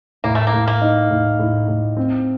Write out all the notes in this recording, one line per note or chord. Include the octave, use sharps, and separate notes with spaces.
A2 A#3
A3
A#3
A2
A#3
D#4
A2
A2
A2
C4